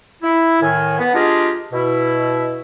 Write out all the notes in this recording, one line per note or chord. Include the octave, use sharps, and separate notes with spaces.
E4
A2 D#3 G#5
B3
G#3 D4 F4 G4 G#4 A#4
B2 E4